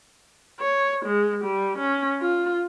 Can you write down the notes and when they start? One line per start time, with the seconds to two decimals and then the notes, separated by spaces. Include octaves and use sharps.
0.60 C#5
1.06 G#3
1.43 G3
1.78 C#4
2.21 F4